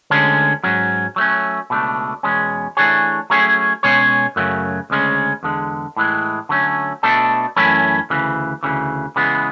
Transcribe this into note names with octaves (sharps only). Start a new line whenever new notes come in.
D2 D3 G#3 C#4
G#2 F#3 C#4
F#3 A3 C#4
C#2 B2 A3 D4
E2 B2 G#3 C#4
E3 A3 D4 G#4 C#5
F#3 A3 C#4 G#4 C#5
B2 G#3 C#4 G#4 C#5
F#2 C#3 F#3 A3
D2 C#3 G#3 C#4
E2 D3 G#3
A2 E3 G#3
D3 F#3 A3 C#4
B2 A3 D4 A4
F#2 E3 A3 C#4 E4
D2 C#3 E3
D2 C#3 E3
C#3 E3 G#3 B3